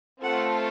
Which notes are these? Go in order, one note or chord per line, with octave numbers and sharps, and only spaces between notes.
A3 C4 F4 A4 F#5